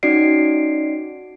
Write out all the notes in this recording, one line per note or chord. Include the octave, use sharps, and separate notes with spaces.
C#4 D#4 F#4 D5 C7 D7